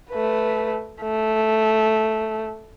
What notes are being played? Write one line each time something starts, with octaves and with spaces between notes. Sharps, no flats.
A3 B4
A3